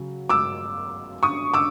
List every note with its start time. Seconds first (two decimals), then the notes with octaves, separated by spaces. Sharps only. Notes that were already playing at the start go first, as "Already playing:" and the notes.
Already playing: C#3 F#3
0.29 D6 E6
1.23 C#6 D#6
1.54 D6 E6